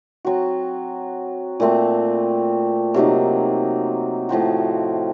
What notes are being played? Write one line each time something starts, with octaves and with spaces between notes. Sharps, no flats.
F#3 C4 F#4
A#2 A3 C4
C3 F#3 A#3 D#4
A2 F3 C4 F#4